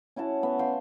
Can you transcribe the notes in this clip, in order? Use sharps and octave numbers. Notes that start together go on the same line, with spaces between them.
C#4 E4 F#4 A5
B3
F5 G5 C6